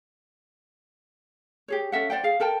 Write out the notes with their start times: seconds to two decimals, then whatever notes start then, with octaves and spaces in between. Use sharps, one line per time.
1.68 G4 G#4 C#5
1.92 C#4 A4 E5 F#5
2.10 C5 D5 F#5 G5
2.24 G#4 F5
2.40 A4 A#4 G5 A5